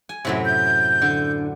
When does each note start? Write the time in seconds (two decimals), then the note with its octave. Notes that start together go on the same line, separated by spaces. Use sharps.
0.09 G#5
0.25 F#2 A2 C3
0.45 G6
1.02 D3